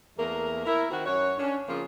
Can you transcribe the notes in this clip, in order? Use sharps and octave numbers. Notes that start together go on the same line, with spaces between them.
E2 A3 A#3 A#4
E4 A#4
D#3 C4 F#4
F#2 F#4 C#5
C#4 D4
C#3 F3 A#3 C4 F4